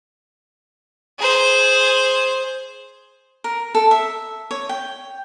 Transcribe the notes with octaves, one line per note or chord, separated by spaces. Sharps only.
G#4 C5
A#4
A4
E5
C#5
G5